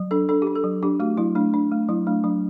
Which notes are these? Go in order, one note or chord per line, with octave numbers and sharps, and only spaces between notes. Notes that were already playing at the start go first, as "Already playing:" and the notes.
Already playing: F#3
D4 A4
D4 A4
D4 G4
A4
F#3
D4 G4
A3 F#4
F#3 E4
A3 D4
D4
A3
F#3 E4
A3 D4
F#3 D4